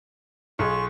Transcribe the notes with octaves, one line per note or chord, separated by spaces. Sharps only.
B1 F4 G#4 C#6